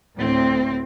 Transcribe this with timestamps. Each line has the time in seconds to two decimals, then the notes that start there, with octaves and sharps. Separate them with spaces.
0.16 D2 A2 C4